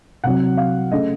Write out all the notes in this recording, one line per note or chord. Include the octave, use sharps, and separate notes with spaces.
C2 C3 F#3 F#5
F5
C#3 A3 D#5